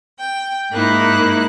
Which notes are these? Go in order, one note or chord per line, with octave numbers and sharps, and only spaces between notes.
G5
G#2 A#3 D#4 E4 F#6